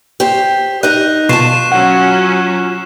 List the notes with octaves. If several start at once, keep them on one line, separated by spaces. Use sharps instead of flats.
G4 C5
D#4 D#5 F#6
B2 F4 A5 C#6 C7 E7
F#3 C#4 F#5